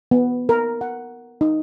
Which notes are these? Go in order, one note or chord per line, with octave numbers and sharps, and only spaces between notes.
B3
A#4
F#5
D#4